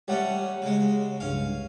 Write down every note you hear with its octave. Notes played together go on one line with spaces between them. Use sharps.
G3 A3 C#4 G4 C#5 F#5
C#3 G#3
C2 G2 C#3 C#4 F5